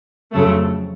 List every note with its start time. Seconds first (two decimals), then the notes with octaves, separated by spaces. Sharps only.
0.33 F2 C#3 F#3 A3